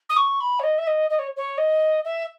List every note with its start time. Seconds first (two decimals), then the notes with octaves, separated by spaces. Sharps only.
0.09 D#6
0.16 C#6
0.40 B5
0.59 C#5
0.63 D#5
0.78 E5
0.87 D#5
1.10 D#5
1.19 C#5
1.36 C#5
1.57 D#5
2.04 E5